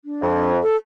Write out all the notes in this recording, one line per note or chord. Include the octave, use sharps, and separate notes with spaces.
D4
F2
A4